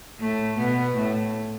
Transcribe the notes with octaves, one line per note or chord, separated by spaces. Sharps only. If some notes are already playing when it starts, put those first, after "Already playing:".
A2 A3
B2 B3
A2 A3